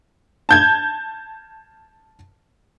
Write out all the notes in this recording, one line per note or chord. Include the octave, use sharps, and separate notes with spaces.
A5 G6 G#6